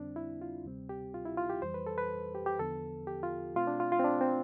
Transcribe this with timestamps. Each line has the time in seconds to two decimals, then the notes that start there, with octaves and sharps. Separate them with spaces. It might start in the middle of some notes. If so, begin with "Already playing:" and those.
Already playing: F2 D3 G3 C4 D4
0.16 E4
0.41 F4
0.65 D2 C3 G3 C4
0.89 G4
1.14 F4
1.25 E4
1.37 F4
1.49 G4
1.62 F2 E3 G3 C5
1.74 B4
1.87 A4
1.98 B4
2.35 G4
2.46 G4
2.58 E2 D3 F3 B3 A4
3.07 G4
3.23 F4
3.55 B2 A3 C4 F4
3.67 D4
3.80 F4
3.92 F4
4.00 C4
4.04 D4
4.21 C4